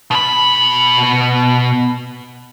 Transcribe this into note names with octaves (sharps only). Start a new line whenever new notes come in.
B2 B5